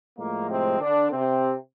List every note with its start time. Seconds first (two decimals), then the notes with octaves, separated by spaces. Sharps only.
0.18 A2 F3 G#3 A#3
0.50 C3 C4
0.81 D3 D4
1.12 C3 C4